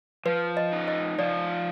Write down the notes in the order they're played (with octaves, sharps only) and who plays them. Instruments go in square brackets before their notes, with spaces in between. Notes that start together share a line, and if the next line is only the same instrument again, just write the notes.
[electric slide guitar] F3 [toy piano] B4
[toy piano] D#5
[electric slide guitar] D#4
[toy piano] D#5
[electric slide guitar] F3 [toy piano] D5